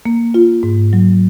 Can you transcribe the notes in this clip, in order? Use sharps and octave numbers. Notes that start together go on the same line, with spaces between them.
A#3
F4
G#2
F#3